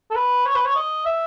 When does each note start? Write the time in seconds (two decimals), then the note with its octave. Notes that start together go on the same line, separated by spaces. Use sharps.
0.11 A4
0.15 B4
0.46 C#5
0.55 B4
0.65 C#5
0.76 D#5
1.05 E5